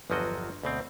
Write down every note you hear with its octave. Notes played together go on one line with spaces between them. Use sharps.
G1 E2 F3 F#3 F#4 D#5
D2 B2 C4